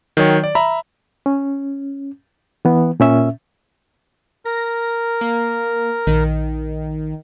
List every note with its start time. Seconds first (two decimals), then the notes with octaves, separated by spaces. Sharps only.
0.17 D#3 F#3 C#5 G5
0.44 D5
0.55 E5 A#5 B5
1.26 C#4
2.65 E3 B3
3.00 A#2 C#4 E5
4.45 A#4 A#6
5.21 A#3
6.07 A#1 D#3